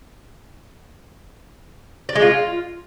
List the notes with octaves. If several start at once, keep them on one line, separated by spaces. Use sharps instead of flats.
D5
G#3
F4